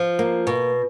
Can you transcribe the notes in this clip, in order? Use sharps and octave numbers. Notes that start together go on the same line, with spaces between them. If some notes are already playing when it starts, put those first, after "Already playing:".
Already playing: F3
A#3
B2